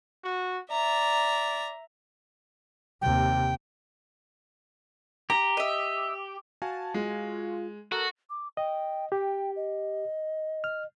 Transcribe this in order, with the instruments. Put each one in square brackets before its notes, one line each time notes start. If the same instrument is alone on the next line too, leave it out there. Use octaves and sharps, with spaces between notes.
[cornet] F#4
[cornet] D5 [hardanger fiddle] E5 A#5
[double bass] D#2 C3 [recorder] G5
[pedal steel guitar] G4 [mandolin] A#5
[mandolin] D#5 E5
[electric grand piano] F#4 F5 G#5 [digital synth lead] A5
[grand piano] G#3 [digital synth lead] F4
[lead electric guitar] F#4 [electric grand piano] A4 [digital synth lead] A#4
[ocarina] D6
[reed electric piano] D#5 [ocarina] G5
[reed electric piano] G4 [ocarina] G5
[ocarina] D#5
[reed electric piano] F6